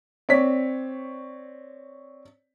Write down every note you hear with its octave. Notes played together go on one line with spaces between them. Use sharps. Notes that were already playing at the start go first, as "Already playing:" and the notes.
C4 C#5 D5 B6